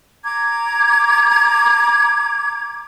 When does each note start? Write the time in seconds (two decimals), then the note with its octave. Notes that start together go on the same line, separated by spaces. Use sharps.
0.23 A#5 D6 G#6